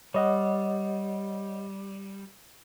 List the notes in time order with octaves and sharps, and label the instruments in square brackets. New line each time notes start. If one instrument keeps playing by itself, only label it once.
[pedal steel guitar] G3 [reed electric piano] C#5 D#5 F#5